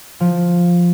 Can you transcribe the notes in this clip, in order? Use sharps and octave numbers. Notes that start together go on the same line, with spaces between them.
F3